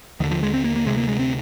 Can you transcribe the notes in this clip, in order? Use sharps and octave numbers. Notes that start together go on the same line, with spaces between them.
D#2 D3 D#3
F3
G#3
C4
A#3
A#3
D2 C3 G#3
A#3
G#3
C4